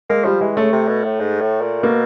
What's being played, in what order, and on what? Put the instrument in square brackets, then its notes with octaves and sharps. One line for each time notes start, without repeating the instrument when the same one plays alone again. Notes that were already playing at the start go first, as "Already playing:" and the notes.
[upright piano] G#3 [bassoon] A#3
[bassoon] F3 [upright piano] G3
[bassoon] E3 [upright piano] G#3
[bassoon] C#3 [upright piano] A3
[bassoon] C3
B2
A2
G#2
A2
A#2
[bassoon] B2 [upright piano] A#3